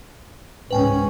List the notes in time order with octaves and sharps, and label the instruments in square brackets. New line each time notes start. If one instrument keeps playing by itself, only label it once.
[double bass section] C#2 G#2 C#4 [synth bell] B4 G5 G#5